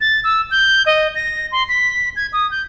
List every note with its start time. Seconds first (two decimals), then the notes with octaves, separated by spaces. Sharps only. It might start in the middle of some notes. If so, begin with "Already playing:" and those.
0.01 A6
0.24 E6
0.51 G6
0.86 D#5
1.15 A#6
1.52 C6
1.69 B6
2.16 G#6
2.33 D#6
2.51 G6